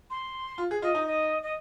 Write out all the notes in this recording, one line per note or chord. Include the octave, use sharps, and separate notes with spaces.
C6
F4
G#4
F4 D#5
D#4
D#5
D#5